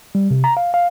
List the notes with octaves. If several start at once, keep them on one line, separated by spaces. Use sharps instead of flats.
G3
C3
A#5
F5
F5